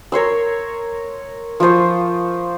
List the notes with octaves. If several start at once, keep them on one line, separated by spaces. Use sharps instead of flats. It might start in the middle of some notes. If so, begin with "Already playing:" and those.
A#4 C#5 C6 E6
F3 F4 C5 C#6